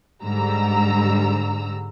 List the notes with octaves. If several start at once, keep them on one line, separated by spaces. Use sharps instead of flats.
G#2 D3 G3 A#5 E6